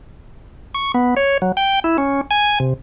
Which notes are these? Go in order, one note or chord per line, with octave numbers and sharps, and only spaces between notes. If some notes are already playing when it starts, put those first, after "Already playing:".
C#6
B3
C#5
F#3
G5
E4
C#4
G#5
C3